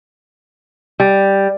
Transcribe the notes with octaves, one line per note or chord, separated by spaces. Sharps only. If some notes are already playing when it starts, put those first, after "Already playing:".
G3